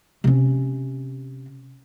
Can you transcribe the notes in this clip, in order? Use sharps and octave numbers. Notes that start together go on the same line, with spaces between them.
C3 C#4